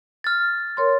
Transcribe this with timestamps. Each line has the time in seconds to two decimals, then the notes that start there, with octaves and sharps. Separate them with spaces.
0.24 F6 A6
0.77 A#4 C#5 C6